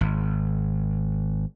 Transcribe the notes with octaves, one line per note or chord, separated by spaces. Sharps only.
G#1